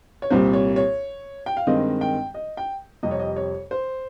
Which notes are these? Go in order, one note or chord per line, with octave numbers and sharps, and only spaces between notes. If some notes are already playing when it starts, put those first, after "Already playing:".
C#5
C2 A#2 G3 C4 C5
C#5
C#5
G5
F5
G2 D#3 G#3 C4 D#5
G5
D#5
G5
F2 C3 G3 D#5
C#5
D#5
C#5
C5